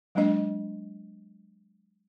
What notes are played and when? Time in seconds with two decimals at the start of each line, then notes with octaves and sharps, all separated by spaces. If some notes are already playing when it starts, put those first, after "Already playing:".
0.15 F#3 G#3 A#3 D4 D#5